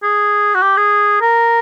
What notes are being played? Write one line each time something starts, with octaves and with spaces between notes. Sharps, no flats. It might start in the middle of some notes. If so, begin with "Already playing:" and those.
G#4
F#4
G4
G#4
A#4